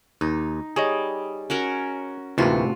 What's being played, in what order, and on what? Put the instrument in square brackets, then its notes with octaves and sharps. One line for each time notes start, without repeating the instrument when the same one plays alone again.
[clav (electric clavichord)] D#2 [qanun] D#4
[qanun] G3 [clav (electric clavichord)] G#4 C#5 D#5
[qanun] C#4 F#4 A#4
[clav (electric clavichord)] D2 E3 A#3 [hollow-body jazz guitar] A2 C3 [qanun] F4 F#4